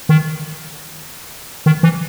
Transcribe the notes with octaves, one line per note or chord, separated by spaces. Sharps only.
D#3
D#3
E3